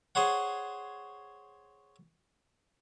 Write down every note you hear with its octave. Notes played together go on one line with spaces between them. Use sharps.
G#4 C5 C#5 F#5